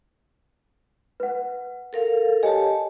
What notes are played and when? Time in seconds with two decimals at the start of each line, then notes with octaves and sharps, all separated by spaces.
1.20 B4 F#5
1.93 A4 A#4 F5
2.43 G4 C#5 D#5 G#5 A5